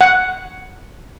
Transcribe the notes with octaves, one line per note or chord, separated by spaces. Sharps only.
F#5